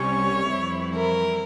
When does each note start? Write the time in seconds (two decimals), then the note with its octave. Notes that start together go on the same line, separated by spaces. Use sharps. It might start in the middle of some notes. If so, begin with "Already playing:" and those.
Already playing: C2 C3 G3 C#4 C#5
0.49 F2 E3 G3 C4 E4
0.93 A#4